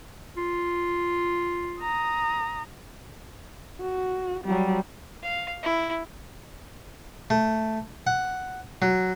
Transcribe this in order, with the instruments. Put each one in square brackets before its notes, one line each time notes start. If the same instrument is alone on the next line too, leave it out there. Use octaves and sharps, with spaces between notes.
[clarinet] F4
[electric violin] A#5 D#6
[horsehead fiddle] F#4
F#3 G3
[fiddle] F5
E4
[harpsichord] A3
F#5
F#3